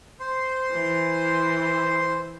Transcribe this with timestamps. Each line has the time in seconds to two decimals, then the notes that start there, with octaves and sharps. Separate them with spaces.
0.20 C5 C6
0.71 E3